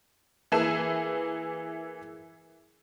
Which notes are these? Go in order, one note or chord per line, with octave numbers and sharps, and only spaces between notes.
E3 A#3 E4 G#4 E7